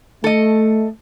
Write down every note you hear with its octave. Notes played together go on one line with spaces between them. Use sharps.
A3 A4 D#5